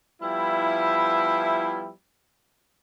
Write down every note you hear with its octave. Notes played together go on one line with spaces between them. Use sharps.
F3 G3 B3 E4